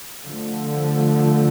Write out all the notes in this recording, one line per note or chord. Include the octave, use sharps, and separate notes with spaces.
D3 F3 A3